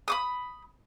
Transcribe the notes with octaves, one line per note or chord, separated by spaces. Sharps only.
B5 D6 D#6